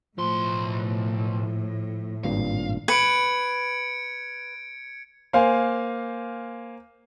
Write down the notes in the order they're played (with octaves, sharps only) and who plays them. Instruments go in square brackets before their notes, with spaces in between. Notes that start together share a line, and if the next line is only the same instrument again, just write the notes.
[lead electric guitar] B1 C6 [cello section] A2 [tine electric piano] F3
[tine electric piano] G#1 G2 A#2 [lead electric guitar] F5
[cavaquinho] B4 [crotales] G#6 C#7 D7
[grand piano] A#3 C5 F5 G#5